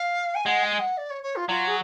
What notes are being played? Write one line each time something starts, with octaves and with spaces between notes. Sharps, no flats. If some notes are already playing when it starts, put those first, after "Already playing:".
Already playing: F5
G#5
G#3 F#5
G#5
F#5
D5
C#5
C#5
F4
F#3 F4
G#4